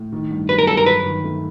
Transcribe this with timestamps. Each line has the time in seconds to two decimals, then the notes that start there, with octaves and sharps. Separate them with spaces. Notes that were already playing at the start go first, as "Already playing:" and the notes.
Already playing: A2
0.12 D#3
0.31 G2
0.49 F#3 B4
0.59 A#4
0.67 G1 A4
0.77 A#4
0.86 F#3 B4
1.05 D#3
1.24 A3